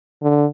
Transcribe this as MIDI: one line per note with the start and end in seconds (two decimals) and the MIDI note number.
0.22 0.45 50